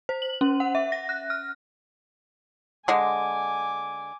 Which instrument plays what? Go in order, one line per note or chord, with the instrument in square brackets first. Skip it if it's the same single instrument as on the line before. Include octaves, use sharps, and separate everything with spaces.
[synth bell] C5
F#7
C#4
F#5
E5
A#6
F#6
F6
[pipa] D3 G#3 [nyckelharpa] G#5 D6